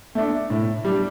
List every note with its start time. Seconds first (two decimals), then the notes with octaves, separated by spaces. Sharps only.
0.15 A3 D4
0.50 A2
0.85 G3 D4